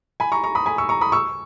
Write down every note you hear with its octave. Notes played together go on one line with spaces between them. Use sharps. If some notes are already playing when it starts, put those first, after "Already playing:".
G#5 B5
A#5 C#6
A#5 C#6
B5 D#6
G#5 B5
C#6 E6
A#5 C#6
B5 D#6
C#6 E6